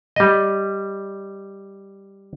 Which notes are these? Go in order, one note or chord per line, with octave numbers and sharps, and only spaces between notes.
G3 D#5